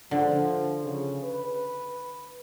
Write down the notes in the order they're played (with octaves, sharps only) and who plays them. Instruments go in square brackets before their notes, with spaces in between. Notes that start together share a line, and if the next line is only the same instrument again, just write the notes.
[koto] D3 [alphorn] F3
[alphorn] C#3
B4